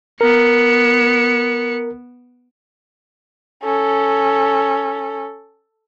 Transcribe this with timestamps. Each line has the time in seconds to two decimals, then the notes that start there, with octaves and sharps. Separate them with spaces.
0.21 B3 A#4 C#7
3.64 C#4 A4